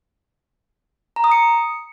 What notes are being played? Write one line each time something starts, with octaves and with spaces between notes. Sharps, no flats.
A#5
D#6
C#7